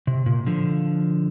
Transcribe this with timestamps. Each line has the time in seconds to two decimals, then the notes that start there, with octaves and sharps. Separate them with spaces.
0.07 C3
0.26 A#2
0.46 D3 F3